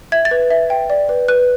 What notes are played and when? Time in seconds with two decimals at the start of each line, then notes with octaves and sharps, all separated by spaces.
0.12 E5 G#6
0.25 A6
0.31 B4
0.51 E5
0.70 G5
0.90 D5
1.09 B4
1.28 B4 F#6